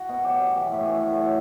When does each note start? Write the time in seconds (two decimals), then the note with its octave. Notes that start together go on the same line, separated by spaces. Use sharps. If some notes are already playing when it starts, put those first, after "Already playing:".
Already playing: F#4
0.09 B2
0.24 F#3 G4
0.40 B2
0.56 E3 G4
0.72 A2
0.87 E3 F#4
1.02 A2
1.18 F#3